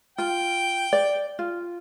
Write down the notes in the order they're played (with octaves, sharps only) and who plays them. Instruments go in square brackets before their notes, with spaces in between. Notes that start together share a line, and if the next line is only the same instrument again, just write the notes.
[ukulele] F4 [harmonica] G5
[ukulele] D5
F4